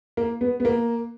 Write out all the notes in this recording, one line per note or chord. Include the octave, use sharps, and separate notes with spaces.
A#3
B3
B3
A#3